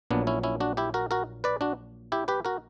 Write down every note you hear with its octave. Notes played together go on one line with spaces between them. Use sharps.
A#1 A#2 F#3 B3 D4
C#4 E4
C#4 E4
D4 F#4
E4 G4
F#4 A#4
F#4 A#4
B4 D5
D4 F#4
E4 G4
G4 B4
F#4 A#4